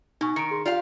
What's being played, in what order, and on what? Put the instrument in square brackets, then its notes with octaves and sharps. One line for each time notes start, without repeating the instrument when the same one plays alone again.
[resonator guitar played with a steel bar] B2 [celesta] D#4 G#5 C#6
[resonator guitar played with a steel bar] D#3 [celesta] C#7 D7
[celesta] G#4 C6
[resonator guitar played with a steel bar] F4 G4 F5 [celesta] D5